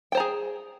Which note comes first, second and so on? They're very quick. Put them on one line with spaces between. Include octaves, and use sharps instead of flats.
G5 C5 A#5 G#4